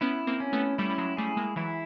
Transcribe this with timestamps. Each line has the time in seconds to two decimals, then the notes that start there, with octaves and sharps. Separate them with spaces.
0.01 B3 C#4 E4
0.27 A#3 C4
0.40 C#4
0.53 A3 B3
0.78 G3 A3 E4
0.90 G3
0.98 F#3 G#3
1.17 G3 A3 G#4
1.37 G#3 A#3
1.56 E3 F#3 E4